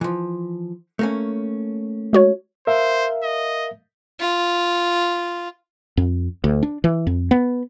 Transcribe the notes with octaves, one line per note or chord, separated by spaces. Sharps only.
E3 F3
A3 A#3 C#4
G#3 F#4 C#5
A#4 C5 E5 F5
D#5
F4
F2
D2
D4
E3
F2
B3